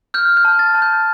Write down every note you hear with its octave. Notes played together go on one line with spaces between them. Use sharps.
F6 G6
G6
A5
A6
A5
G6